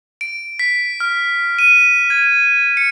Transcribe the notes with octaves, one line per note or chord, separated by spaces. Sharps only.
D7
B6
F6
D#7
G#6
C#7